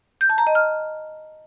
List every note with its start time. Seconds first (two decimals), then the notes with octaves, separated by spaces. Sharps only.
0.21 G6
0.29 A5
0.38 A#5
0.47 D#5
0.55 F6